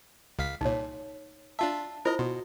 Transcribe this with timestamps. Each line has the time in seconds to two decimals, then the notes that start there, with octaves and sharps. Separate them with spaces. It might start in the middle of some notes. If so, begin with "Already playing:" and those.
0.39 C#2 F5 B6
0.61 C2 A#2 D#4 C#5
1.59 D4 F4 E5 A5
2.05 E4 F4 A#4 C5 D#5
2.19 B2 F#4